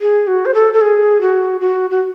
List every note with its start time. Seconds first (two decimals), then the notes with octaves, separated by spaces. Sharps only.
0.01 G#4
0.27 F#4
0.46 C5
0.54 A4
0.73 A4
0.81 G#4
1.21 F#4
1.61 F#4
1.90 F#4